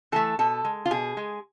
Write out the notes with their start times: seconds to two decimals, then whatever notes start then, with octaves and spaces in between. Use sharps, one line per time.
0.12 E3 A3 A4
0.39 B2 A4
0.65 G#3
0.86 F4
0.91 B2 G#4
1.17 G#3